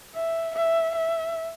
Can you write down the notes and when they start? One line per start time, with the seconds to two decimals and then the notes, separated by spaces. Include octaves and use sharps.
0.15 E5
0.56 E5
0.95 E5